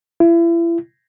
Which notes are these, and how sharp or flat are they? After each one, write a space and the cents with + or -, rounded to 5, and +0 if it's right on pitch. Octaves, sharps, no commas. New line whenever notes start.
E4 +35